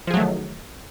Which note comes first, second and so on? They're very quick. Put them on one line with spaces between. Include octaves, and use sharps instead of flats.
F3 G#4 F#3 A3 D#3